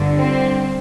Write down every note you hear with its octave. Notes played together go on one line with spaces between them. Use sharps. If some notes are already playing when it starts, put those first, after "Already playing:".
Already playing: G1 G2 D3
C4